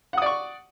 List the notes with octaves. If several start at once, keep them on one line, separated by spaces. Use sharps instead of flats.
D5 F#5 C#6 D#6